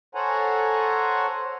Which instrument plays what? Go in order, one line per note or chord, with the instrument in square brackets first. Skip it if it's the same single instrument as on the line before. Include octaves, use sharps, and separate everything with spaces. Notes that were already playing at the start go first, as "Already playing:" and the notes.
[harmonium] A4 C5 C#5 F#5 G#5 A#5